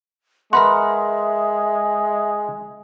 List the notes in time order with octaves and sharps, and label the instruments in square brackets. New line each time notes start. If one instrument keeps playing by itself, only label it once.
[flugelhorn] G#3 [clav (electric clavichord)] A#4 B4 F#5 [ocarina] E5 [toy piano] C6